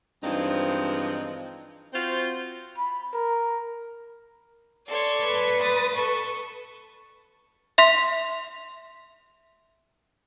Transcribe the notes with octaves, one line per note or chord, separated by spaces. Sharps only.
G2 E3 F3 G#3 C4 D#4
C4 F4 F#4 C5
B5
A#4
A4 C#5 D5 C6
B4
D#6 A6
A4 C#6
E5 C6 B6